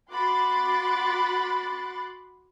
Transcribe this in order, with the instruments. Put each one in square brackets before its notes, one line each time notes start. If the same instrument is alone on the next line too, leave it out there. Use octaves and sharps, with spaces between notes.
[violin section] F#4 B5 C6 D6 F#6 A6